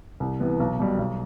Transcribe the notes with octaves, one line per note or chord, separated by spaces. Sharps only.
C2
C3 E3 B3
B1
B2 G3
B1